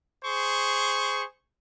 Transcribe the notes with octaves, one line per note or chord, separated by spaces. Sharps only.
G#4 C5 C#6